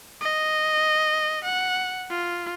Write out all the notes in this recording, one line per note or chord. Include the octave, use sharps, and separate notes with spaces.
D#5
F#5
F4